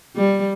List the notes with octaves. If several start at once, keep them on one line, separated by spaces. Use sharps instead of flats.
G3